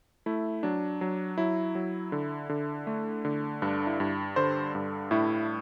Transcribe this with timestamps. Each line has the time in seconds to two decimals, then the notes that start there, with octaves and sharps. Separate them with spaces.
0.26 A3 E4
0.63 F#3 D4
1.01 F#3
1.38 F#3 E4
1.75 F#3
2.12 D3
2.49 D3
2.87 A3
3.25 D3
3.62 G2 D4
3.87 E4
4.00 G2
4.36 D3 C5
4.75 G2
5.11 A2 E4